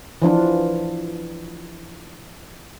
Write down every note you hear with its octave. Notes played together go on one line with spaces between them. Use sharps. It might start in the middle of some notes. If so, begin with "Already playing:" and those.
E3 F3 D4 F4